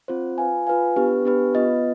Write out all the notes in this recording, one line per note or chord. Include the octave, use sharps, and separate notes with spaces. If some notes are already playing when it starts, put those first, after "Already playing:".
C4 F4 C5
F4 B4 F5 G#5
F4 B4 F5 G#5
B3 D4 G4 B4
B3 D4 G4 B4
B3 F4 B4 D#5